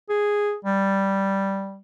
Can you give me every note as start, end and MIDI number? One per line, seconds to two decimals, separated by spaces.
0.09 0.55 68
0.65 1.80 55